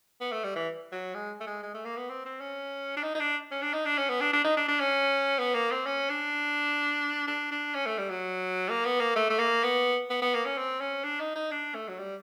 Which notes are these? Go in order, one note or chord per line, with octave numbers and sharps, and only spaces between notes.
B3
A3
G3
E3
F#3
G#3
A3
G#3
G#3
A3
A#3
B3
C4
C4
C#4
D4
D#4
D#4
D4
C#4
D4
D#4
D4
C#4
B3
D4
D4
D#4
D4
D4
C#4
B3
A#3
C4
C#4
D4
D4
D4
C#4
A3
G3
F#3
A#3
B3
A#3
A3
A3
A#3
B3
B3
B3
A#3
C#4
C4
C#4
D4
D#4
D#4
D4
A3
F#3
G3